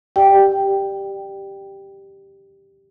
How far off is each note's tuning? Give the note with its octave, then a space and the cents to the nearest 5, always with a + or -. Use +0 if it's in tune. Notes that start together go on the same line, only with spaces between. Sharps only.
G4 +0 D5 +25 G5 +0